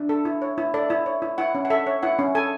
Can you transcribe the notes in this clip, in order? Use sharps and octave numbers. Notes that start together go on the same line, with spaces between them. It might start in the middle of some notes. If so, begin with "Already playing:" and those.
Already playing: D4
A4
E4
C#5
E4
A4 D5
E4
C#5
E4
E4 F#5
C#4
F#5
A4 E5
C#5
E4 F#5
C#4
A4 G#5